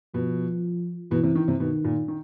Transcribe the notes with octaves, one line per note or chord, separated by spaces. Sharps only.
B2 F3
B2 E3
C3
D#3
C3
B2 D#3
A#2
D#3